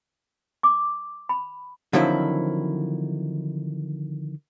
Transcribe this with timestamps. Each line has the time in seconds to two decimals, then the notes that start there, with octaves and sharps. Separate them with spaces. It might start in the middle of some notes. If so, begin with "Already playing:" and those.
0.63 D6
1.29 B5
1.93 D3 D#3 F3 F#3 C4 E4